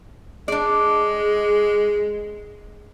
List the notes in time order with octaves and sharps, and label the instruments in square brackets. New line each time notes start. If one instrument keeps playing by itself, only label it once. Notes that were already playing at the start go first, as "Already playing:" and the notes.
[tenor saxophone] G#3 [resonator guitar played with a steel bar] D4 D5